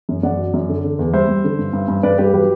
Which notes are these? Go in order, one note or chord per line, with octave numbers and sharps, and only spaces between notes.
F#2
F#2 D5 F#5
F#3
F#2
D3
D3
E2
G3 C5 E5
G3
D3
G2
G2
G2
G2 B4 D5
G2 G4 B4
F#3 G4 B4